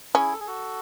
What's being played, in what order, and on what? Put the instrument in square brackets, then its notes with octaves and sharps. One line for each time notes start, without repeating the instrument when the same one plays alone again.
[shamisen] C#4 [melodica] E4 G#4
[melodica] A4
G#4
F#4 A4